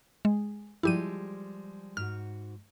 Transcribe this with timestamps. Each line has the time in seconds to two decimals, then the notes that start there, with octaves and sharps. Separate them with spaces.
0.25 G#3
0.83 F3 G3 G#3 E4 G4 D#7
1.97 G#2 F#4 F6